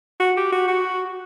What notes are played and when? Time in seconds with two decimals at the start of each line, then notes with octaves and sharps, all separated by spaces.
0.20 F#4
0.37 G4
0.52 F#4
0.68 F#4